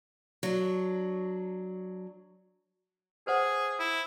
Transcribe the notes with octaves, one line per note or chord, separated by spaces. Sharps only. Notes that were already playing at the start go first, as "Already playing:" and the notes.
F#3 D4
G#4 B4 C5 F#5
E4